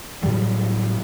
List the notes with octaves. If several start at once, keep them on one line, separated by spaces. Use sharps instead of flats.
A2 C#3 F#3 G3